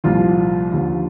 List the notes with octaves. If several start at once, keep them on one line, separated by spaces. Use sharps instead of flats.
C2 A#2 F3 F4
D#2 D3 F3